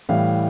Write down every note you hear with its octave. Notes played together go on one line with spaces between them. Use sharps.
A2 E3 G3 F5